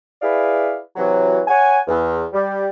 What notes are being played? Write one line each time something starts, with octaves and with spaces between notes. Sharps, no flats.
E4 G#4 B4 D5 F5
C3 E3 F#3
C#5 F#5 G#5
E2
G3